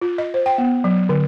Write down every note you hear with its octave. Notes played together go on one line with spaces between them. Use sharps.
F4
D#5
C5
G5
B3
F#3
D3